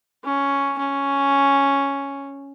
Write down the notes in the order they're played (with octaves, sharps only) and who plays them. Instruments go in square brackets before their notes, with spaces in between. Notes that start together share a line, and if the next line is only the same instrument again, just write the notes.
[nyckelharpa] C#4
C#4